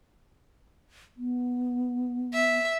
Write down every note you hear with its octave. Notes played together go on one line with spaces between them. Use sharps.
B3
E5